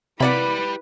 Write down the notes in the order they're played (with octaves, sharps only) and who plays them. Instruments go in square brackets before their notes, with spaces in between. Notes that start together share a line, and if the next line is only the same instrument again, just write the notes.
[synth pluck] C3 [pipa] A#3 D5 F#5 [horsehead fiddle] E4 B4 [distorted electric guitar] G4 B5